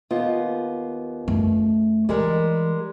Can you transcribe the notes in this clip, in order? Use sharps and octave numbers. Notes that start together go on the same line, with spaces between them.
D#2 B3 F4
F#2 A3
E3 G3 G#3 A#4